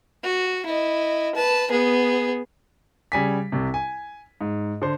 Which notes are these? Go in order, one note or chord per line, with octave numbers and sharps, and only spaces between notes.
F#4
E4 D#5
B4 A5
B3 G#4
C#3 G3 G#5 B6
C2 C3
G#5
G#2
D3 C5